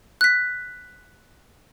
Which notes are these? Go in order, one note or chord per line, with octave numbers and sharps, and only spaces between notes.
F#6 B6